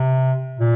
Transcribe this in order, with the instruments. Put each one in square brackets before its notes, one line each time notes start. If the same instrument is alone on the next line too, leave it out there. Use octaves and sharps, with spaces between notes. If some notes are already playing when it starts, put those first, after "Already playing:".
Already playing: [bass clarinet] C3
A#2